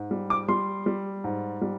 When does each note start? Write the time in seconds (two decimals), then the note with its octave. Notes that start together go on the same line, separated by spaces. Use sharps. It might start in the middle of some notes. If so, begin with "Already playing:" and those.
Already playing: G#2
0.11 G3
0.30 D6
0.48 G3 C6
0.86 G3
1.24 G#2
1.61 G3